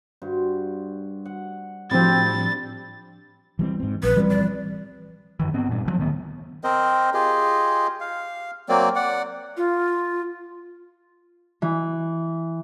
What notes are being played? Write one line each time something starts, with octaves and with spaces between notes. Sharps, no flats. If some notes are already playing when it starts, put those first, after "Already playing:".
G2 F#4 C5
F#5
A2 F3 G3 C4 D4 A6
E3 G3 C4
G#2 C4
A#1 B4
E3 F3 G3 C4
D5
F#2 D#3 E3
G#2 B3 C4
G2 A#2
D2 F3 F#3
D2 D#3 B3
C4 A#4 C5 D#5
F4 G4 G#4 D#5
F5
F#3 A#3 C4 D5
D5 F#5
F4
E3